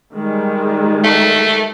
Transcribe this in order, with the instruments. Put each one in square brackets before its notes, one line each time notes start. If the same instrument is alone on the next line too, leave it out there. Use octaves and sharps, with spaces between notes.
[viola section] D#3 G3 G#3
[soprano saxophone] A3